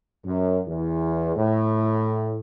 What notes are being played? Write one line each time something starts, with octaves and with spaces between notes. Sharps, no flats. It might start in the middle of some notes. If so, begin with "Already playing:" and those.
F#2
E2
A2